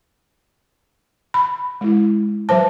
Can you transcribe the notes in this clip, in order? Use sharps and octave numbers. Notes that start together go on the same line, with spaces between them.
B5
G#3 E4
F#3 B4 C5 A5